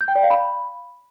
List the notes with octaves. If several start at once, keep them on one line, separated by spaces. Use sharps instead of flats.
G6
G5
D5
F5
B5